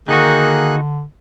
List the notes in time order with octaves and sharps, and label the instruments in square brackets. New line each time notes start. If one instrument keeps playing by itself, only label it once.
[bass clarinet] D3 [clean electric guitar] D#3 D#4 F#4 [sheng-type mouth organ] A#3 G#4 F#6